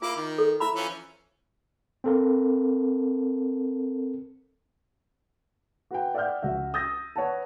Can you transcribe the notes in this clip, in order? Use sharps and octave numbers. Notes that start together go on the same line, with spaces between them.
A#3 E4 F4 D6
D#3
A4
E4 E5 A#5 B5
E3 F3 C#4
C4 A4 A#4
F#4 B4 G5
D5 E5 F#5 G5 F6 G6
C#2 F#4 E5
D#6 E6 G6 A6 A#6
B4 C#5 F#5 A5